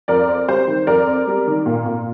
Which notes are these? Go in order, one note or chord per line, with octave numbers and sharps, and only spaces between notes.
F2 A#4 D5
C4
G3 C5
D#3
F2 A#4 D5
C4
G3
D#3
A#2
A#2